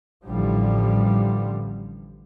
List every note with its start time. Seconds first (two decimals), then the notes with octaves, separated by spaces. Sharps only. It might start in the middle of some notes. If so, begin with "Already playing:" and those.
0.25 A1 D3 F3 G3